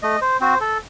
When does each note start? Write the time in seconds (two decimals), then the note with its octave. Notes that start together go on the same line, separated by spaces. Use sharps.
0.02 A3 D#5
0.21 C5
0.40 C4 F#4 C5
0.61 A4